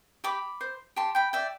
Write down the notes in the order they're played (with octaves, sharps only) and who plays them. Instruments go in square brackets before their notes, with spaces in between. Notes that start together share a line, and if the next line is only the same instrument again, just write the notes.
[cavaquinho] G4 B5 D6
C5
G4 A5 C6
G5 B5
D5 E5 G5